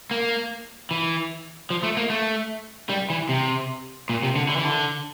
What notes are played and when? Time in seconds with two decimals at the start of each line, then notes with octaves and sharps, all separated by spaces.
0.11 A#3
0.91 E3
1.70 F3
1.83 A3
1.97 A#3
2.10 A3
2.89 G3
3.10 E3
3.29 C3
4.09 A#2
4.23 C3
4.36 D3
4.49 D3
4.56 E3
4.64 D3